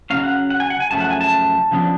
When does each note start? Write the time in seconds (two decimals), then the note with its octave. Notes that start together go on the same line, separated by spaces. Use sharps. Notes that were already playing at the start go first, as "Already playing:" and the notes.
0.10 C#3 F#3 C#4 F5
0.24 F#5
0.50 F#5
0.60 G#5
0.70 F#5
0.80 G#5
0.90 F#2 C#3 F3 A3 A5
1.01 F#5
1.10 G#5
1.21 A5
1.71 C#3 F3 B3 D4